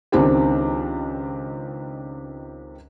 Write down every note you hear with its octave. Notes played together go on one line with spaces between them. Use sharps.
C#2 D#3 C4 D4 G4